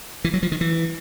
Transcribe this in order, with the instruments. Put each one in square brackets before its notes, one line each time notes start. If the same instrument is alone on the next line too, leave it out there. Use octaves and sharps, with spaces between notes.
[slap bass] E3
F#3
F3
D#3
E3